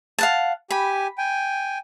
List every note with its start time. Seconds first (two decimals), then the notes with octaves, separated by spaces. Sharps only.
0.19 F5 F#5 A5
0.71 G4 G#5 B5
1.18 G5 G#5